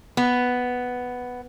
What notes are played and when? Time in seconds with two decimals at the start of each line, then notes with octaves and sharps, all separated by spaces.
0.17 B3